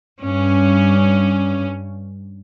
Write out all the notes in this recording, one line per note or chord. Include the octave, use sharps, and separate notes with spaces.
G2 C#4